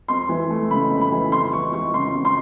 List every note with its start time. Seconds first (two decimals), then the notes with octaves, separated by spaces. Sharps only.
0.08 F2 C6
0.29 E3
0.50 A3
0.71 C#3 B5
0.91 F2
1.01 B5
1.11 E3
1.32 F2 C6
1.52 E3 C#6
1.73 G#3 C#6
1.94 C#3 C6
2.15 F2
2.25 C6